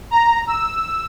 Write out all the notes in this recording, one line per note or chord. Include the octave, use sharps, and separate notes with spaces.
A#5
E6